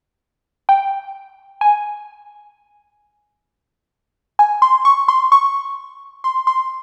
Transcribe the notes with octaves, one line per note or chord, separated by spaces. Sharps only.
G5
G#5
G#5
C6
C#6
C6
C#6
C6
C6